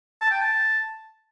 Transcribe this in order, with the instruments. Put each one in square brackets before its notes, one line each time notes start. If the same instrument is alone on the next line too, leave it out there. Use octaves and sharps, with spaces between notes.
[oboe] A5
G5
A5